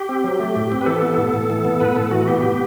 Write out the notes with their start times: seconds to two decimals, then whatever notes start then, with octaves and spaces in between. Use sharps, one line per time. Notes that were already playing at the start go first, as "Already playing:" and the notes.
Already playing: G4
0.09 C4
0.24 F#3
0.40 A3
0.56 A2
0.72 C4
0.81 B4
0.86 E3 A4
1.02 B3
1.18 A2
1.34 A2
1.50 E3
1.65 B3
1.80 A2 B4
1.96 A2 A4
2.11 E3 F#4
2.28 B3 G4
2.43 A2